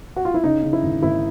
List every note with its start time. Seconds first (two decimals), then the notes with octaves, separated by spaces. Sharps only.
0.16 F#4
0.25 F4
0.34 E4
0.44 C#3 D#4
0.63 C#3
0.73 E4
0.83 G#1
1.03 G#1 E4